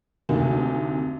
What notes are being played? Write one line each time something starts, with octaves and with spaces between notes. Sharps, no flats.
F1 D2 C3 A#3 D#4